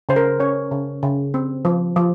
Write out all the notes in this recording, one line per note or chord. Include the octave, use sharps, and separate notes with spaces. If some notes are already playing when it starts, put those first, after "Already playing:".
C#3 C5
A#4
C#4 C#5
C#3
C#3
C4
F3
F3